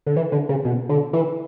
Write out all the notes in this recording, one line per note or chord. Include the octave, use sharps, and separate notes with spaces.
D3
E3
D3
C#3
B2
D3
E3